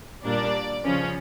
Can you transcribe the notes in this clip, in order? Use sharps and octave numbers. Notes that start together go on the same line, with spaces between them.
A#2 G3 A#3 D4 D5
C#3 F3 C#4